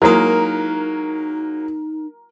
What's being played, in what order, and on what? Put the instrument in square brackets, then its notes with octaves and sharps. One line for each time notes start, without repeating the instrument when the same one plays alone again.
[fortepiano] F#3 G#3 A#3 [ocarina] D#4 [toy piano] E4 F#4 D#6 [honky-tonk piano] A#4